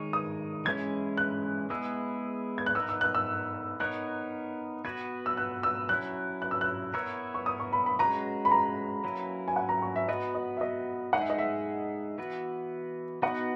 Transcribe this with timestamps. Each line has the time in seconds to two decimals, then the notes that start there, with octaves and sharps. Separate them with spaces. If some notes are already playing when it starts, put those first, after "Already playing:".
Already playing: D#3 G#3 D#4 A#4 C#5 C#6
0.13 D#6
0.65 E3 G#3 C#4 E4 G#6
1.18 F#6
1.70 G#3 B3 E4 G#4 E6
2.58 G#6
2.66 F#6
2.75 B3 D#4 A#4 E6
2.89 E6
3.01 F#6
3.15 E6
3.80 B3 D#4 A#4 C#5 F#6
4.85 B3 F#4 B4 G#6
5.26 E6
5.37 F#6
5.63 E6
5.89 F#3 C#4 E4 F#6
6.42 F#6
6.51 E6
6.61 F#6
6.94 B3 E4 A#4 C#5 E6
7.34 C#6
7.46 D#6
7.60 C#6
7.73 B5
7.86 B5
7.99 G#3 C#4 F#4 B4 A#5
8.45 B5
8.51 A#5
9.04 F#3 A#3 C#4 E4 B4
9.48 G#5
9.56 F#5
9.69 A#5
9.82 C#6
9.96 E5
10.08 B3 F#4 B4 D#5
10.35 D#5
10.57 E5
10.61 D#5
11.13 G#3 D#4 G#4 F#5
11.21 E5
11.30 D#5
11.38 E5
12.18 E3 B3 F#4 B4
13.22 B3 D#4 F#4 B4 F#5